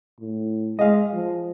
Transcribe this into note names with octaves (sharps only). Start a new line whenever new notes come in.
A2
G#3 D#5 F5
F3